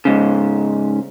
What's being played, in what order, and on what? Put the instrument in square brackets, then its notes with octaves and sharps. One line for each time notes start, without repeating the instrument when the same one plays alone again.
[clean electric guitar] G#2 C#3